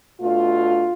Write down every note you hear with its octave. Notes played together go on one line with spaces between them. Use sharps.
B2 A3 D4 F4